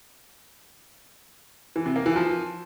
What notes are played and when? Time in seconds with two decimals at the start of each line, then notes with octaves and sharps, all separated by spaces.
1.76 E3
1.86 C3
1.96 A#3
2.06 E3
2.16 F3